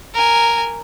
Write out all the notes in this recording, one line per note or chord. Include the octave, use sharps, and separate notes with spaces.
A#4 G#5